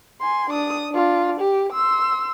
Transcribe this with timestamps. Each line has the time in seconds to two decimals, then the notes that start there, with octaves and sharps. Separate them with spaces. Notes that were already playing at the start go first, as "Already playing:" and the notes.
0.21 G#5 C6
0.50 D4 D#6
0.91 D4 F4
1.40 G4
1.72 C6 E6